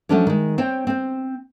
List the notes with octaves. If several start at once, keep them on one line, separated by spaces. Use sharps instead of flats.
F3 F#3 A3 C#4 D4 C#5
D#3 G#3
C4 C5 C#5 G5
C4 C5